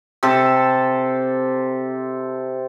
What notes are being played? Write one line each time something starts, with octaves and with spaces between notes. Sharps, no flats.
C3 A4